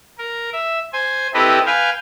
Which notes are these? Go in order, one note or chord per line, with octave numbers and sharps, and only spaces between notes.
A#4
E5
C5 G#5
C4 E4 G4 A4 B4 D#5
B4 F5 G5 G#5